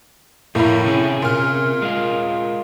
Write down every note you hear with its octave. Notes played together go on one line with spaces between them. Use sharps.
F2 A2 A#3 E4 A#4
C3 C#4 G#4
A#2 F6
G#3 F4